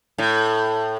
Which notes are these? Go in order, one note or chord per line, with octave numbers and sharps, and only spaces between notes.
A2